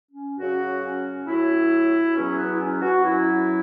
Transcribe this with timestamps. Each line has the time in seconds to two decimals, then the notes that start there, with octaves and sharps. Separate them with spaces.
0.10 C#4
0.38 F#2 C#3 F#3 F#4
0.84 C#4
1.27 A2 F#3 E4
2.16 E2 B2 F#3 C#4
2.38 B3
2.54 E4
2.60 C#4
2.82 F#4
3.04 F#2 F#3 E4